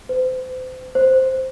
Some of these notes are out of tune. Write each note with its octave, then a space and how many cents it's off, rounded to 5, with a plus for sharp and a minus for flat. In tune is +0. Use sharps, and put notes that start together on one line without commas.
C5 -35
C5 +0